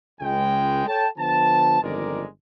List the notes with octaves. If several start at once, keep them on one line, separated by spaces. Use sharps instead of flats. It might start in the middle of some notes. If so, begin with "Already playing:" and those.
C#2 G#3 G5
A4 C#5 G5 A5
D3 F3 B3 A5
G1 F2 D#3 G#3 A#4 D5